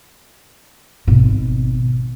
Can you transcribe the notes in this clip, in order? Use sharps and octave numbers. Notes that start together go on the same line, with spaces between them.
G#1 B2